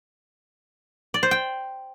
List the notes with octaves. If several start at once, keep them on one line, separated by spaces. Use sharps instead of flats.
D5
C5
G5